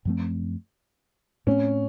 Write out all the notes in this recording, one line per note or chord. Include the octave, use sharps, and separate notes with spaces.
F#2 F3 A3 C4
A2 A3 C4 C#4